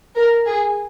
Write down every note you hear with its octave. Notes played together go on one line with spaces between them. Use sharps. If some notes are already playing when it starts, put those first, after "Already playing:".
A#4
G#4